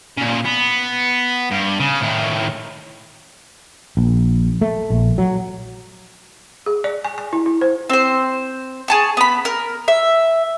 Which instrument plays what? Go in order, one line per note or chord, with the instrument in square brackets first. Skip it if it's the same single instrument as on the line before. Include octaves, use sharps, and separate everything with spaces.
[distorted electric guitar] A#2 C#3
B3
G2
C#3
A2 D#3
[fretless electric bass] A#1
A3
A#1
F#3
[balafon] G#4
D5
G#5
G#5
E4
E4
C5
[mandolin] C4 C5
G#4 A5 C#6
B3 B5
A#4
E5